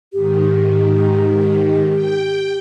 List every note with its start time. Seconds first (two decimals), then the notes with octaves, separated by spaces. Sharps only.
0.13 G#2 D#3 G4
1.95 G5